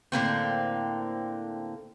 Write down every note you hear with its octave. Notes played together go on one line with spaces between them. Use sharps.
A2 D3 A#3 C4